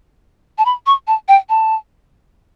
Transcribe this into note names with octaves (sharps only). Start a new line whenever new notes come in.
A5
B5
C#6
A5
G5
A5